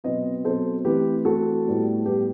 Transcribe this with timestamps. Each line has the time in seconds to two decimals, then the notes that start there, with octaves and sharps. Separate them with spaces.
0.04 B2 F#3 C4 B4 D#5
0.45 B2 F#3 C4 A4 C5
0.85 E3 A3 C4 G4 B4
1.25 E3 A3 C4 F#4 A4
1.66 A2 G3 B3
2.06 A2 G3 B3 G4